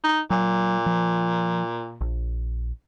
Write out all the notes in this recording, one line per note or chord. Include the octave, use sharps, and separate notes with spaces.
D#4
A#2 F#3
F3
A#1